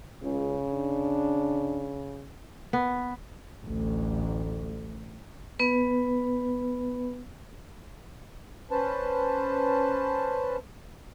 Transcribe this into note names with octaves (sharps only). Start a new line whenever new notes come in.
C#2 C#3
D4
B3
A1 D2
B3 B4
C#4 B4 C5 A5